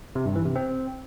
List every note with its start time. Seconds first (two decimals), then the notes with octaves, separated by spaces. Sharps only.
0.15 C3
0.25 G2
0.36 E3
0.46 C3
0.56 C4